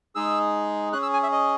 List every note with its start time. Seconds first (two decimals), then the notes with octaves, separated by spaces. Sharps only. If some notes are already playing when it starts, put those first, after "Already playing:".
0.15 G#3 D#4 G#4 E6
0.93 C#4 G#4 F#6
1.02 E6
1.13 G#5
1.23 E5
1.32 D#5